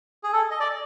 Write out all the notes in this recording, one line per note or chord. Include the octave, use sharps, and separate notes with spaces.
G#4
A4
D#5
D5